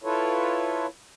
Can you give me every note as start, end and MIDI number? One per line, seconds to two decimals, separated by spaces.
0.03 0.86 64
0.03 0.86 65
0.03 0.86 69
0.03 0.86 71
0.03 0.86 73